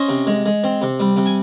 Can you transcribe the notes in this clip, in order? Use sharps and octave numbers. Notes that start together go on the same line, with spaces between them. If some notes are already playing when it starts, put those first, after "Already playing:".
Already playing: C#4 C5 D#5
C3
G#3
G#3
C4
C3
G3
C3
G#5